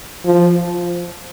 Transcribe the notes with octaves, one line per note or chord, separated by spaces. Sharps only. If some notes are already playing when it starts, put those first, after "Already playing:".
F3